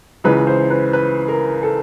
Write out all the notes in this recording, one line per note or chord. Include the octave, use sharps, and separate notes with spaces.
C#2 C#3 E3 B4
C5
B4
B4
A#4
A4